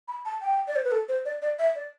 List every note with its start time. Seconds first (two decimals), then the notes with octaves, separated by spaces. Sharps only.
0.08 B5
0.25 A5
0.42 G5
0.68 D5
0.76 C5
0.84 B4
0.92 A4
1.09 C5
1.25 D5
1.42 D5
1.59 E5
1.75 D5